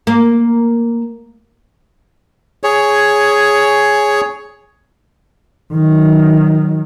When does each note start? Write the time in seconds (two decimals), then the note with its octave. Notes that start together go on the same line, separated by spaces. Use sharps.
0.07 A#3
2.63 G#4 C#5
5.73 D#3 F#3